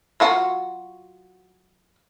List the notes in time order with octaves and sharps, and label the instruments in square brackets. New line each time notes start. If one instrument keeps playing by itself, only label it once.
[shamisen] F#3 F4 F#4